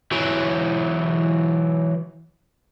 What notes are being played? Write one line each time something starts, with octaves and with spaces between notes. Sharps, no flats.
E3 F#3